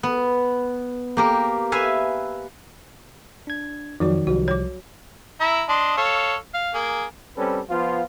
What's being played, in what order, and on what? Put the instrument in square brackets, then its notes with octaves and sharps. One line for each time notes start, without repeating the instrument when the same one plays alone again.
[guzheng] B3
A#3 G4 A#4
B4 E5 F5 G#5
[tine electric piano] D4 G#6
[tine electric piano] F2 F3 [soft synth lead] D#3 [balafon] F#3 F#4 D5
[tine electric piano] C2 F3 G3 [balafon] F#4
[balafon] C#5 D6
[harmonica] E4 E5 A#5
D4 D#5 C6
A4 C#5 F5
F5
A#3 G#4
[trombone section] G3 C4 C#4 A4 B4
F3 B3 F4